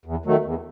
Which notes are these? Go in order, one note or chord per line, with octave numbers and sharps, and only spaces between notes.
E2
D#3 F#3 A3
E2